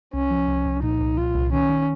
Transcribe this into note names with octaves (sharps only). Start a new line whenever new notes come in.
C2 C#4
F3
C2
C2
A#2 D#4
C2
A#2 F4
C2
D#3 C#4
D#3